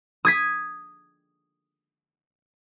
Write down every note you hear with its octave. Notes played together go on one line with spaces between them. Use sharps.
D#6 G#6 B6